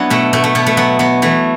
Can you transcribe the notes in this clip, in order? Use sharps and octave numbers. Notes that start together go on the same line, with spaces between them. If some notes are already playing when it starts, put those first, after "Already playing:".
Already playing: F#3 B3 D4 E4 F#4
B2 A3
B2 A3
A3
B2 B3
A3
F#3 B3
F#3 B3
E3 A3